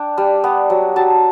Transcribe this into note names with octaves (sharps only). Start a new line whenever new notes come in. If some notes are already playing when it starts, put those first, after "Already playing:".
Already playing: D4 G5
G3
B3
F#3
F#3 A5